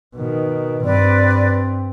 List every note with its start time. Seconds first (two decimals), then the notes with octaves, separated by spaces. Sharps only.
0.16 B2 D#3
0.85 G2 C4 B4 D5